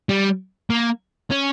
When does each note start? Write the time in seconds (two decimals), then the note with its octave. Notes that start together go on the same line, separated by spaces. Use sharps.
0.09 G3
0.70 A#3
1.31 C#4